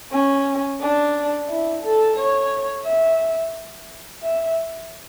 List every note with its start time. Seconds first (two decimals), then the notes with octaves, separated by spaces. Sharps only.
0.11 C#4
0.81 D4
1.49 E4
1.83 A4
2.17 C#5
2.85 E5
4.22 E5